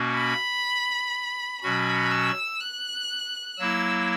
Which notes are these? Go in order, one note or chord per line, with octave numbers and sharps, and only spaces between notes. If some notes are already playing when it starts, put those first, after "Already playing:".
Already playing: B2 A#3 C#4 F#4
B5
B2 F#3 C#4 F#4 B5
E6
F#6
F#3 A#3 E4 E6